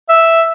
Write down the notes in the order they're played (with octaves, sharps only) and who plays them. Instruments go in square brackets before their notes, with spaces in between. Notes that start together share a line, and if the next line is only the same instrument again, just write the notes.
[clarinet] E5